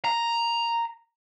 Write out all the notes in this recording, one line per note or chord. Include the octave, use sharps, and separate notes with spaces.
A#5